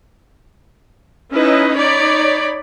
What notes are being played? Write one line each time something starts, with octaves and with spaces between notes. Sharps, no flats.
C#4 D#4 E4 B4 D#5
D#4 C#5 D5 B5